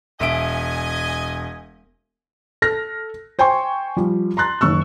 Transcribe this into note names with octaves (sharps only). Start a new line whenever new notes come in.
E1 D#5 E5 G#5 D7
A4 F6 A#6
C5 G5 G#5 C6 C#6
F3 G3
A#5 C6 F#6 A6
F#1 D#3 C#6 E6